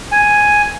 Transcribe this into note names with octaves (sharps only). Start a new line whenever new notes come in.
G#5